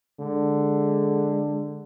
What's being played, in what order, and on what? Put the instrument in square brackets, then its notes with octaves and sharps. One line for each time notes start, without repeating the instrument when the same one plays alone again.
[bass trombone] D3 [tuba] G#3